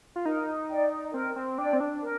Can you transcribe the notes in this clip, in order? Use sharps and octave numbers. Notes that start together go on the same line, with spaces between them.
F4
D#4 A#4
D5 G5
C4 A#4
C4
D4 D5 G5
C4
D4
A#4